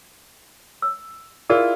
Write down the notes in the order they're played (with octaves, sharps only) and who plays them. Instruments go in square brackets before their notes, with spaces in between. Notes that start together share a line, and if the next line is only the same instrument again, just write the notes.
[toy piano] E6
[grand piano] E4 F4 [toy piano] G#4 A#4 D5